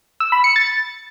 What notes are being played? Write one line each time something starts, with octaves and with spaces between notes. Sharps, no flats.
E6
B5
C#7
A6